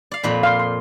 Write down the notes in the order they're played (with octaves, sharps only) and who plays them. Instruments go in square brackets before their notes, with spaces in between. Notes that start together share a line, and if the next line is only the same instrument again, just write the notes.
[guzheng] D5 F5
F2 A#2 B5
[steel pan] F5 C6
C6